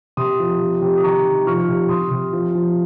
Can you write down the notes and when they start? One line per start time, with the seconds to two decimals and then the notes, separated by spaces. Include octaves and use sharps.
0.17 C3 C6 D#6
0.39 F3
0.61 C3
0.82 C3
0.97 D#6
1.04 D#3 A#5 C#6
1.25 D#3
1.47 F3 C#6 F6
1.69 C3
1.89 C3 C6 D#6
2.11 C3
2.33 F3
2.55 F3